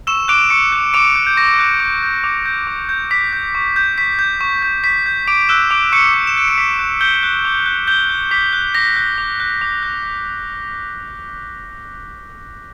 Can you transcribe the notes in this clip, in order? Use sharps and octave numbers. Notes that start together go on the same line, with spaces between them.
C#6 E6 E7
D6 F#6 D7
C#6 C#7
F#6
C#6 D6 D7
F#6
G6
C#6 A#6
F#6
D6
G6
D6
G6
D6
G6
D6 B6
G6
C#6
G6
C#6 B6
G6
C#6
G6
C#6 B6
G6
D6 D7
E6 F#6 E7
D6 D7
C#6 F#6 C#7
D6
E7
F#6 D7
C#7
D6 B6
F#6
D6 G6 G7
F#6
D6
F#6
D6 G6 G7
F#6
D6 B6
F#6
D6 A#6
F#6
D6
F#6
D6
F#6